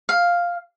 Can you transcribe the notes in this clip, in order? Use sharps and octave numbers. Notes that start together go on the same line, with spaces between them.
F5